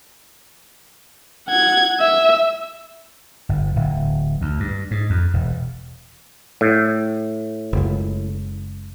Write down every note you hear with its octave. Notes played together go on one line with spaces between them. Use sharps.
F#5 G#6
E5
G1
D1
D2
G2
G#2
F2
E1
A2
F#1 C#2